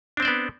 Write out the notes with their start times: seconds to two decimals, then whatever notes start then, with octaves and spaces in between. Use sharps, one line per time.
0.17 D4
0.20 C4
0.22 C5
0.25 D5
0.28 B3